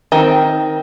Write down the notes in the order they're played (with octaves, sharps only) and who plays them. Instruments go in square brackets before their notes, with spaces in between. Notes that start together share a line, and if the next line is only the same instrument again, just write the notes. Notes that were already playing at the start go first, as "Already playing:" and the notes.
[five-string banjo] D#3 C4